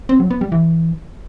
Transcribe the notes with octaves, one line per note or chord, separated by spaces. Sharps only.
C4
F#3
B3
G3
E3